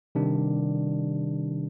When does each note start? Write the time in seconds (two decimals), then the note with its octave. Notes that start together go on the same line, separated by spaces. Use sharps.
0.15 C3 D#3 G3 D4